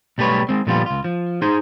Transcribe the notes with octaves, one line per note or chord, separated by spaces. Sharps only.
B1 G3 A3 B4 C#5
G#3 C4
A#2 D3 F3 G3 B3 F4
C#2 F4
F3
D#4 G#4 C5 C6